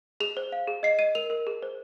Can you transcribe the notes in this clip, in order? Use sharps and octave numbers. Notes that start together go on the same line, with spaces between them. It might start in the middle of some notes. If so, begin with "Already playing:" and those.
G#4 F7
C5
F5
G#4
D#5 C7
D#5 D#7
A#4 F7
A#4
G#4
C5